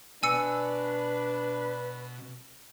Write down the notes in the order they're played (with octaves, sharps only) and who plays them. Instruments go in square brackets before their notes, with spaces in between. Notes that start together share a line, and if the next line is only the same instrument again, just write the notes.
[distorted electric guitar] B2 [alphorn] D4 [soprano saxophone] B4 [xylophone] G#5 E6 C#7